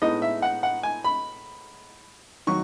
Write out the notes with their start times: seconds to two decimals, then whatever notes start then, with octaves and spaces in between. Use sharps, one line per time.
0.02 A2 G#3 B3 D#4 D#5
0.22 E5
0.42 F#5
0.63 F#5
0.83 G#5
1.04 B5
2.47 D#3 F#3 C#6